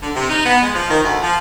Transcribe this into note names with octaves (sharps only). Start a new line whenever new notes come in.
D3
C3
D#4
B3
G#3
F3
D#3
D2
F3